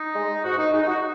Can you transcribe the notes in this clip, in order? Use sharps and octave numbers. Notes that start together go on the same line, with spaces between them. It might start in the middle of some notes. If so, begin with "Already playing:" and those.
Already playing: D#4
G#3
G#2 F#4
D#4
G#3 D#4
D#4
F#4